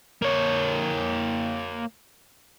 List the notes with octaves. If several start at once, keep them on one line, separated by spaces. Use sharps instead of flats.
A#3 C#5